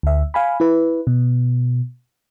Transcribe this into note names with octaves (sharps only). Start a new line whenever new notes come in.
D2 E5
F5 G#5 B5
E4 B4
B2